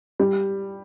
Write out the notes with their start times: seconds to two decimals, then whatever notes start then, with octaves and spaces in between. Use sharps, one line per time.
0.20 G3